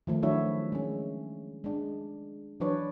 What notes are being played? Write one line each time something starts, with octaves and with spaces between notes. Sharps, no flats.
D#3 F3 A3
F#3 D4 E4 F#4 C#5 E5
G#3 C#4
G#3 D4
E3 F#3 D4 B4 C#5 D5